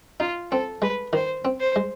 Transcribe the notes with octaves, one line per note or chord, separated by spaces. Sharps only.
D#4 F4
C4 A4
G#3 B4
D#3 C5
C4
C5
G#3